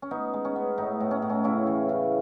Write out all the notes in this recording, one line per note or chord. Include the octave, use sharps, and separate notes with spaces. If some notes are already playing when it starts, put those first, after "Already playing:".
C#4
B3 D#4
G#3
C#4
B3
A2 D#4
A2
C#4
A2
C#4
C#3 C#4 E4
E3
C#3